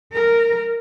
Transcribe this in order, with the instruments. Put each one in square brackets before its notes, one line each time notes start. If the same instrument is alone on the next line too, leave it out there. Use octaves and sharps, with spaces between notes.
[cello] A#4